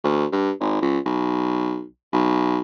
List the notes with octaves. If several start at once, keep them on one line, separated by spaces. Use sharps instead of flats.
D2
G2
G#1
C#2
B1
B1